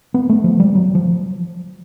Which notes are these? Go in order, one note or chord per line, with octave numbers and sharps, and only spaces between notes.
B3
A3
F3
G3
F#3
F3